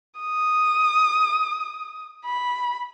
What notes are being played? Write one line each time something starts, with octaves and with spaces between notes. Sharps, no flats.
D#6
B5